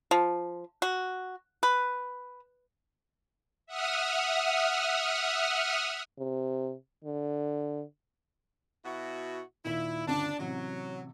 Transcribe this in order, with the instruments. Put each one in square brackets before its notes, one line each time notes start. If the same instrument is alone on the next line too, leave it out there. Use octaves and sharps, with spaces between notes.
[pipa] F3
F#4
B4
[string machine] E5 F#5 D#6 F6
[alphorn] C3
D3
[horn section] B2 E4 F#4
[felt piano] D#2 A#2 [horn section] E4
[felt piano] G1 D2 C#3 [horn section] D4
[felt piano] A1 C3 [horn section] F#3